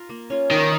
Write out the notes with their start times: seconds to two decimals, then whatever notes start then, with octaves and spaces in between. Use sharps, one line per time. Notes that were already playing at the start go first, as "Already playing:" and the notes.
Already playing: F4 A#4
0.09 A#3
0.30 C#4 F4
0.51 D#3 A#3